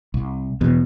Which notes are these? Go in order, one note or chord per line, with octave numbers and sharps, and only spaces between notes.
C2
E2 B2